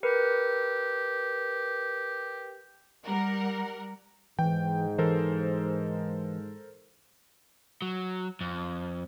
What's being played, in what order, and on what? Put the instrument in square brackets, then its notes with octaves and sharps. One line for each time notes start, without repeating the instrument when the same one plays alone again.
[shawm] G4 [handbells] A#4 B4
[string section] G3 A#4 F#5
[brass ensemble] G#2 [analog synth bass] E3 [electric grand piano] G5
[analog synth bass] E3 [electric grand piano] A4 A#4 C5
[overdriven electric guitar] F#3
F2